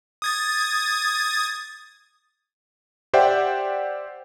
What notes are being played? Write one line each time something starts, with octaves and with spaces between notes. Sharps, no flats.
D#6 G#6 A6
G4 C5 D5 E5 F#5 G5